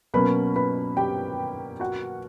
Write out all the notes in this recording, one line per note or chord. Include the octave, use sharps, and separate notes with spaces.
B2 F#3 A#3 C#4 B4 B5
B4 B5
G4 G5
F#4 F#5